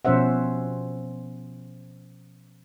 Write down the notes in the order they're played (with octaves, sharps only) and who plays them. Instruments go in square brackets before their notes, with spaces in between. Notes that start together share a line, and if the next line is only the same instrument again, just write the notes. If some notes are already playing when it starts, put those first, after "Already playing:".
[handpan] B2 F3 C#4 C5 E5 F#5